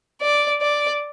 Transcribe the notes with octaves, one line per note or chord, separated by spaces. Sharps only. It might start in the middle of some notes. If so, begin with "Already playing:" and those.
D5
D5